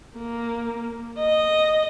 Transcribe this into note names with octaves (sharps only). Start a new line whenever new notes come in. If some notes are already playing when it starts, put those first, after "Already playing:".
A#3
D#5